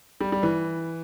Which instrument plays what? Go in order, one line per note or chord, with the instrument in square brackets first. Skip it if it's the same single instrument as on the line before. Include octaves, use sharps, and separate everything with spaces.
[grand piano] G3
G3
E3